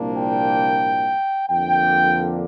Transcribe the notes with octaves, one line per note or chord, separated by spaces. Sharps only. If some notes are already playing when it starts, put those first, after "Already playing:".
Already playing: C2 A#2 F3 A#3 D4
G5
F2 D3 A#3 D4 G5